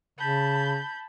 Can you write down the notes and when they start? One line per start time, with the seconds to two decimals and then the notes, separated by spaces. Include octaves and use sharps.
0.19 C#3 A5 B5 G6